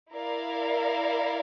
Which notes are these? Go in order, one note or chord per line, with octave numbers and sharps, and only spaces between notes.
E4 A#4 D5 F5